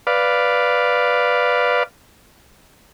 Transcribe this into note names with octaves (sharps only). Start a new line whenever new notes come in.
B4 D5 F5